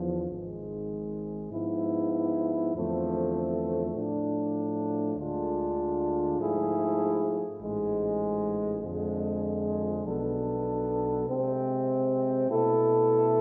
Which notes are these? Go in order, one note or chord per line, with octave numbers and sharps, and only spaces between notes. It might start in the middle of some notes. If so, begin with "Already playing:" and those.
Already playing: E2 D3 F3
G#1 G#2 G#3
G#2 F3 B3 E4
E2 D3 F3 A3 C4
A2 F3 A3 D4
D2 D3 G#3 D4 F4
G#2 F3 A3 E4 G#4
A1 G#2 G#3
F2 D3 F3 G#3
B1 B2 B3 D4 A4
C3 G#3 C4
B2 A3 E4 A4